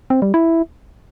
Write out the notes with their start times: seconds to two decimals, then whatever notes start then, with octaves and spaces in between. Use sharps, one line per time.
0.10 C4
0.22 G3
0.34 E4